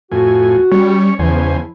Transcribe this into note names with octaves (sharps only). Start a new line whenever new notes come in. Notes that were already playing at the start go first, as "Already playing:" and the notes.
F2 A2 F#4 G#5
G3 C#4 C#5
E2 C#3 F3 E4 C5 G#5